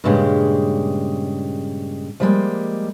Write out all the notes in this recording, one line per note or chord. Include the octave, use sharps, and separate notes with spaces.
G2 A#2 C#3 G#3 G4
F3 G3 G#3 A#3